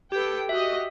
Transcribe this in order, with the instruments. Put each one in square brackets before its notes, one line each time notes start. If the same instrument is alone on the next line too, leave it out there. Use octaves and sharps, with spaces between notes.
[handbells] G4 [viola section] A4 B4 G5
[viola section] F#4 G4 D#5 [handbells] E5